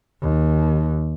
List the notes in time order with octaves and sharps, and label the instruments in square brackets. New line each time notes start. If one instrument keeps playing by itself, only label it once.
[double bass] D#2